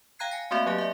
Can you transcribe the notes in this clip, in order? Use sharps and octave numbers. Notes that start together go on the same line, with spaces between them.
F5 G5 A#5 F#6 G#6 C7
G#5 A#6
A3 A#3 C4 F#4 D5 E5
F#3 A#3 G4 G#5
D5 E5